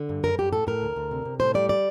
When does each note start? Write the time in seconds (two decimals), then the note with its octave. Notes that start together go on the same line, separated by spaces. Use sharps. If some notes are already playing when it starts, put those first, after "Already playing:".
Already playing: D3
0.09 G2
0.24 F#2 A#4
0.38 F#2 G4
0.53 A2 A4
0.67 A2 A#4
0.82 D2
0.96 D2
1.11 C3
1.25 C3
1.40 A2 C5
1.54 G3 D5
1.69 D5